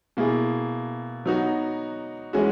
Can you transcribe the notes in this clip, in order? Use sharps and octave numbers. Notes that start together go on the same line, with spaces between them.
B2 A#3 E4 G#4
F#3 B3 D#4 F#4
E3 G#3 C#4 F#4